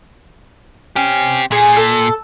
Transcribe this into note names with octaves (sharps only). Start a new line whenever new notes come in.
C4 C#4 G4
A#2 G#4
A4